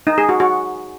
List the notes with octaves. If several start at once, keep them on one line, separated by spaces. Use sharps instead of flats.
D#4
G#4
F#4
F#4